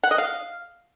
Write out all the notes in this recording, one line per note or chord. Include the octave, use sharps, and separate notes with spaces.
F#5
D#5
F5